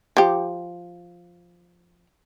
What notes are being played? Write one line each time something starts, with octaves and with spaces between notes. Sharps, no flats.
F3 G4